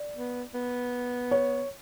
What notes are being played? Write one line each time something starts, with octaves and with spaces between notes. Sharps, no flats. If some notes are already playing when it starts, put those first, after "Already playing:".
Already playing: D5
B3
B3
C#5